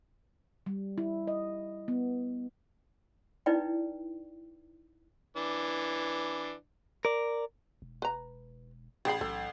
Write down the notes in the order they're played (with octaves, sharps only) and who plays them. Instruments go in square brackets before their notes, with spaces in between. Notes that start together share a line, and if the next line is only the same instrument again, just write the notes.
[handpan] G3
E4
D#5
B3
[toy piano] D#4 E4 B4 D5 G5
[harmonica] E3 D4
[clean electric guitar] A#4 D5
[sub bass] E1
[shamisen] B4 A#5
[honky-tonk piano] A1 G5 C7 [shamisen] G#4 B5
[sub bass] B1 [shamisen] A4